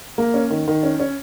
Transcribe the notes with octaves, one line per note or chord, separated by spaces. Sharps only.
A#3
C#4
D#3
D#3
C#4
C#4